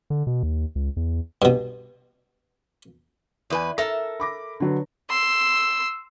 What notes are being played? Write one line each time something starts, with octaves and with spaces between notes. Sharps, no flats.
D3
B2
D#2
C#2
E2
G2 B2
E2 B4 D5 G#5
A4 A#4 E5 A#6
B5 D6 A#6
D3 F#3 B4
C6 E6